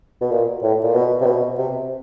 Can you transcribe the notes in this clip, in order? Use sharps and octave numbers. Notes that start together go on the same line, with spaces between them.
B2
A#2
A2
A#2
B2
C3
B2
C3